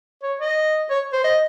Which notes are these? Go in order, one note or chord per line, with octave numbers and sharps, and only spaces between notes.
C#5
D#5
C#5
C5
D#5